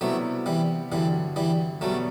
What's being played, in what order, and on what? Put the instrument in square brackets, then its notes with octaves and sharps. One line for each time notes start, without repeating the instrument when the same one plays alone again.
[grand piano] C3 G3 B3 E4 [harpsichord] F#3 A3
[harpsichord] E3 G3
[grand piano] G2 D3 F#3 [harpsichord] E3 G3
[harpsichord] E3 G3
[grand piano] B2 G3 B3 [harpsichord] F#3 A3